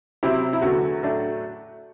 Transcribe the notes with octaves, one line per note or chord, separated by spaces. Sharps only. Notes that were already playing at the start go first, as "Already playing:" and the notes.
C3 F#3 C4 E4 G4
E4
E2 D3 F#3 A3 F#4
A2 F#3 A3 D4